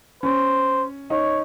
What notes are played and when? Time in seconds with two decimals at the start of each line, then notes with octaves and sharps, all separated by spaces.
0.23 C#4 C5
1.10 D#4 C#5